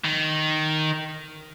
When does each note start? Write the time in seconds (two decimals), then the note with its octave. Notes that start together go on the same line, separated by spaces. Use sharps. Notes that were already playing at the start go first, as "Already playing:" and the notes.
0.04 D#3